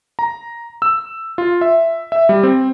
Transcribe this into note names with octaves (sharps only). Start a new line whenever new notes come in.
A#5
E6
F4
E5
E5
G3
C4